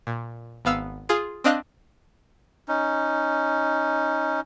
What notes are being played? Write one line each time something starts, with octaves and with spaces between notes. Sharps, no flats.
A#2
G#1 B3 F5 E6
F4 G#4
C4 D4 D#5 F5 F#6
C#4 D#4